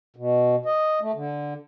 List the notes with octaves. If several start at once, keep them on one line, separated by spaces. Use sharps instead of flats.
B2
D#5
A3
D3